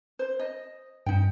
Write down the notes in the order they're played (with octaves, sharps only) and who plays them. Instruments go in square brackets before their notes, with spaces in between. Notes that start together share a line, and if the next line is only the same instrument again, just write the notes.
[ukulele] C5
D#5
[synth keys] G2 [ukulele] D#4 G5